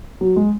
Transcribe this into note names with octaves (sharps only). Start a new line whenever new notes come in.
F#3
G#3